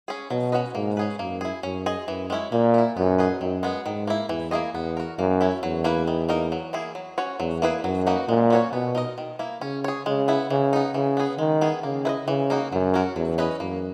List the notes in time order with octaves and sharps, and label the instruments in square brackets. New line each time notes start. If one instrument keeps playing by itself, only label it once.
[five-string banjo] C#4 G#4
[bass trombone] B2 [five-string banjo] F#3
[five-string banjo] C#4 F#4 B4 D#5
[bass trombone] G#2 [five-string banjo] A#3
[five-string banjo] C#4 G#4 B4
[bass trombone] F#2 [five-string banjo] A#3
[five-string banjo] E4 G#4
[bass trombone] F#2 [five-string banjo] C#4
[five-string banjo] G#4 D#5
[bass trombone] F#2 [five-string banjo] E3
[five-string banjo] G#3 C#4 E4
[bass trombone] A#2 [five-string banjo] A#3
[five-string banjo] E4 A#4
[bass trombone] F#2 [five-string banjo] B3
[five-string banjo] D#4 G#4 B4
[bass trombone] F#2 [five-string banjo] D#3
[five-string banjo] G#3 B3
[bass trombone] G#2 [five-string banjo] D#3
[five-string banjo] A#3 E4
[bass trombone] E2 [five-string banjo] E3
[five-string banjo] A#3 E4 G#4 D#5
[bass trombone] E2 [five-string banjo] B3
[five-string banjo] F#4 A#4
[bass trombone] F#2 [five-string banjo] A#3
[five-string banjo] C#4 E4
[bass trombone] E2 [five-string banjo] F#3
[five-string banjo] A#3 E4 B4
D#3
A#3 D#4 A#4
F#3
A#3 E4 G#4
F#3
C#4 F#4 C#5
[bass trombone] E2 [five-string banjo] F#3
[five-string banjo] A#3 E4 G#4 B4
[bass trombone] F#2 [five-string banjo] F#3
[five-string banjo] A#3 D#4 F#4 B4
[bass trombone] A#2 [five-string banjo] G#3
[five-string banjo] C#4 F#4 C#5
[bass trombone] B2 [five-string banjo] B3
[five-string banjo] D#4 A#4 D#5
D#3
A#3 E4
[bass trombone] C#3 [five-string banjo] C#4
[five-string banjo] G#4 C#5
[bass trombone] C#3 [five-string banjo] G#3
[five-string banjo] B3 E4
[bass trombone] C#3 [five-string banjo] E3
[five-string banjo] B3 D#4
[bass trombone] C#3 [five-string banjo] E3
[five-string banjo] B3 D#4 G#4
[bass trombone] D#3 [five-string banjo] G#3
[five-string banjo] B3 E4 G#4
[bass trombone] C#3 [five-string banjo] A#3
[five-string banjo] E4 B4 D#5
[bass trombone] C#3 [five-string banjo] E3
[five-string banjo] A#3 D#4 F#4
[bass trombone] F#2 [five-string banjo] F#3
[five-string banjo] C#4 F#4 A#4
[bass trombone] E2 [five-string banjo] F#3
[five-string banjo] C#4 E4 B4 D#5
[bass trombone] F#2 [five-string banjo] A#3